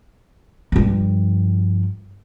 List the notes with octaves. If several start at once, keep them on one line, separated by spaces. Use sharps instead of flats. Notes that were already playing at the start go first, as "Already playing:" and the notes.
G2 F3